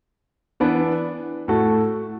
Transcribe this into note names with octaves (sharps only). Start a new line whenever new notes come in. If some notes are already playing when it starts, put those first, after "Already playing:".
E3 B3 D4
A2 A3 F#4 A4